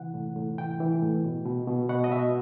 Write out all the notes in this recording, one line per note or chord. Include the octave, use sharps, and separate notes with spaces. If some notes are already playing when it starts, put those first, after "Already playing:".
Already playing: C3 E3 F#5
A2
A2
E3 G5
E3
A2
B2
B2
B2
B2 F#5
D#5
B2 E5